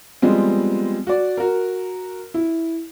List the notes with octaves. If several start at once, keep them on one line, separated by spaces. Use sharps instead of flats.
F3 G3 G#3 B3 C4
F#4 D5
F#4 A#4
E4